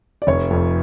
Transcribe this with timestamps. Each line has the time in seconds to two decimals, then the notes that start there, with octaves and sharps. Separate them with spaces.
0.22 D5
0.27 F1 C#5
0.51 F2